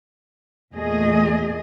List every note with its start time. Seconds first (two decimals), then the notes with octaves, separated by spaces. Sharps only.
0.74 E2 A#2 A3 G#4 D#5